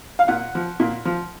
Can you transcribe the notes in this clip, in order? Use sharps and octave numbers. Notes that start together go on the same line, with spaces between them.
F5
A#2 F#5
F3
A#2
F3